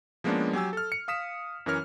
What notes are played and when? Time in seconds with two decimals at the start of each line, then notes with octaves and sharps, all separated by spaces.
0.24 F3 G#3 A#3 B3 C#4 D4
0.53 F#3 G4 G#5 E6
0.73 A4 F6
0.92 C#7
1.08 F5 D#6 B6 E7
1.66 F#2 E3 C#4 A#4 C#5 F6